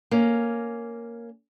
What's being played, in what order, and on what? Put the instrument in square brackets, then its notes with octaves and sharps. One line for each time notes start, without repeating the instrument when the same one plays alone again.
[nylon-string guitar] A#3 C#4